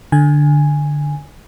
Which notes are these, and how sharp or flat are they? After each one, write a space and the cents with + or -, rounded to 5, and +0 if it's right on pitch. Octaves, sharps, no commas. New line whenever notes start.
D3 +5 G#5 -5